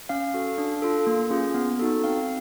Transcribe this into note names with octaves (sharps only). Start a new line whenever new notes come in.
C#4 F5
F#4 A4
D4
F4 A4
A#3
C#4 F4 G#4
B3
D#4 F#4 A4
C4 F5